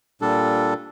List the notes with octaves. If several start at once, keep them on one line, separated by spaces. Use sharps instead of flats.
A#2 G3 D4 A4